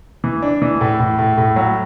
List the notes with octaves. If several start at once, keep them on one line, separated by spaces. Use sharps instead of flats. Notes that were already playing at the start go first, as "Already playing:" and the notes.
E3
D4
E3
A2
A2
A2
A2
F#3